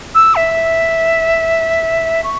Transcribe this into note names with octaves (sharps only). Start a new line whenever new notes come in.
E6
E5
C#6